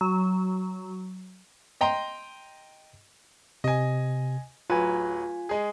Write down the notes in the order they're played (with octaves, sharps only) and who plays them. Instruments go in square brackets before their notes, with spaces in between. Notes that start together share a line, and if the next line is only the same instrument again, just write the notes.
[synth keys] F#3
[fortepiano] D#5 G5 A#5 C6
[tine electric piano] C3 [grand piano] D#5 G#5
[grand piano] D1 F#3 B4 [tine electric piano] F4 G#5
[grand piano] G#3 G#4